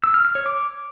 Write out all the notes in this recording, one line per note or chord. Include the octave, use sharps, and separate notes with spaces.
E6
F6
F6
C#5
D6